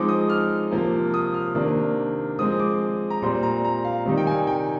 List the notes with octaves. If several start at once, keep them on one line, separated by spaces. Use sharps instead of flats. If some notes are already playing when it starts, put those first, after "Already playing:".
Already playing: F3 G#3 C4 D#4 D6
D#6
F6
C3 F3 A#3
D#6
F6
C3 D#3 A#3 D4
F3 G#3 C4 D#6
D6
A#5
A#2 G3 C4 C6
A#5
A#5
F5
C3 D#3 G3 C4 D#4
G5
G#5
G5